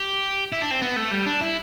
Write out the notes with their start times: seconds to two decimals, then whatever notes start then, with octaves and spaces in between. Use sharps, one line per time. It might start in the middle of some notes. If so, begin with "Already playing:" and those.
Already playing: G4
0.52 E4
0.62 D4
0.71 C4
0.82 B3
0.96 A3
1.11 G3
1.26 D4
1.41 E4